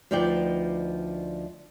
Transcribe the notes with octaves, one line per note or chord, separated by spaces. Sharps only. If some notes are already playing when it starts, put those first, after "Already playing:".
D2 F3 D#4 B4 D5 G5